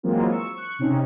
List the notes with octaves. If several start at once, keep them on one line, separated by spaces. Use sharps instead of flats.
E3 F#3 G#3 A#3 C4 F4
C#6 E6
C#6 F#6
C3 C4 C#4 D#4